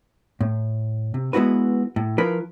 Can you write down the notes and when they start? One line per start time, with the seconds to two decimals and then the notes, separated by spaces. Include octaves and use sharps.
0.41 A2
1.14 C3
1.33 G#3 B3 E4 F#4 B4
1.96 A2
2.18 F3 E4 F4 A#4 B4 B5